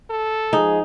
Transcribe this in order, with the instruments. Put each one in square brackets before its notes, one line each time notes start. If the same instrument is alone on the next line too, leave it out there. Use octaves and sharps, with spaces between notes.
[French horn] A4
[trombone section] F3 G#3 G#4 [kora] D#4